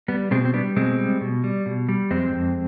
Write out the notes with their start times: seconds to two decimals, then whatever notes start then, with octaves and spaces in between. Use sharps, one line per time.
0.08 G3 B3
0.31 B2 G#3 C4
0.45 C4
0.53 G3 B3 D4
0.76 B2 G#3 C4
0.98 G3
1.21 B2
1.44 G3
1.66 B2
1.89 G3
2.11 F2 G#3 C4
2.33 F2